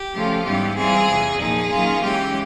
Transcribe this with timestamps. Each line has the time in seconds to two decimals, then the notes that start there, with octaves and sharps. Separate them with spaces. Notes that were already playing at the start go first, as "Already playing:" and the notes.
Already playing: G4
0.13 C#3 F3 A3 C#4 F4
0.45 G#2 E3 G3 B3 G4
0.76 E3 G3 C4 F4 G#4
1.08 E2 C3 E3
1.39 A#2 F3 A#3 D#4 G#4
1.70 D#3 F#3 A#3 C#4 F4
2.02 C#3 E3 G#3 C#4 G4